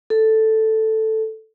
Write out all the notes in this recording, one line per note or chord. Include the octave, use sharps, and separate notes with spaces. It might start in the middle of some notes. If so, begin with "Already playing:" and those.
A4